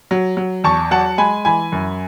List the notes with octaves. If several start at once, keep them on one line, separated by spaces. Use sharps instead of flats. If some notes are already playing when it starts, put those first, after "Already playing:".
F#3
F#3
E2 A5 C#6
F#3 F#5 A5
G#3 G#5 B5
E3 G#5 B5
F#2